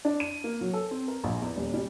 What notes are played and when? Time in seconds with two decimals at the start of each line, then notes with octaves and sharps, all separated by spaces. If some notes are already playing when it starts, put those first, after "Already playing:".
0.05 D4
0.20 D#7
0.44 A#3
0.61 F#3
0.74 A4
0.91 C4
1.08 A#4
1.24 A#1
1.42 E2
1.57 D#1
1.74 G3